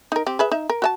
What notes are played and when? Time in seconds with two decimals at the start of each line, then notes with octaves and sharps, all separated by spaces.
0.12 D#4 A#4
0.26 C4 G4
0.39 G#4 B4 E5
0.51 D#4 E5
0.70 A#4
0.82 F#4 E5 A5